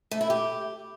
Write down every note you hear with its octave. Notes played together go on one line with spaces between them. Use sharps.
A3
E4
G4